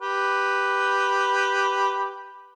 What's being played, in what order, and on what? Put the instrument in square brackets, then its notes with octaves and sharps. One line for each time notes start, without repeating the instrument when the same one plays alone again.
[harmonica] G4 B4